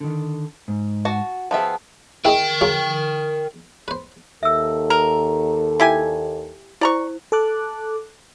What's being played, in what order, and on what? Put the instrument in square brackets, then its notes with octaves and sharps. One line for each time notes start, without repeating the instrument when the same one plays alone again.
[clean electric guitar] D3 D#3
G#2
[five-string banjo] F#4 A5
[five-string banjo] F3 B3 E5 [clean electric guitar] G#4 G5 A5
[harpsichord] E4 G#4 D#5 [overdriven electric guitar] A#4 G5
[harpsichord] F#3 F4 G#4
B4 C5
[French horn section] D#2 A4 [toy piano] E5 E6
[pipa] A#4
E4 G4 G#5
[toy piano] E4 C5 [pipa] D5 A#5 C#6
[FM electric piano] A4 A5 D6 F#6